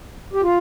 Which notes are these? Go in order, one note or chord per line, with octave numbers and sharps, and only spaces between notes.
G4
F4